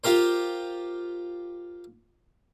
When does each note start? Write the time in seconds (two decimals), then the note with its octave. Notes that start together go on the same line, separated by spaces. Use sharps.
0.04 F4 G4 A#4 C5